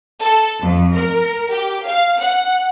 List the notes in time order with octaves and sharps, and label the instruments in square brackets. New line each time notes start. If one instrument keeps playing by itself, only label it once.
[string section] A4
F2
A#4
G4
F5
F#5